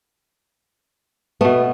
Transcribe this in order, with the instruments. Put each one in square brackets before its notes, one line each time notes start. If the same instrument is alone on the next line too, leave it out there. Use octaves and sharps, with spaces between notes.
[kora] B2 A3 [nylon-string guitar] B3